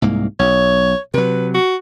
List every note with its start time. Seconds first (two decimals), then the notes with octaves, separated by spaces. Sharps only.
0.02 C2 G#2 A#3
0.39 B1 C#5
1.14 C3 F#3 B4
1.54 F#4